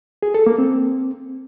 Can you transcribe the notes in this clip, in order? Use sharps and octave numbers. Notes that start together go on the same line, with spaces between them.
G#4
A4
A#3
C4